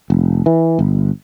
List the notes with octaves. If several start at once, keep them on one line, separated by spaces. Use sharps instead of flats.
F1
E3
G1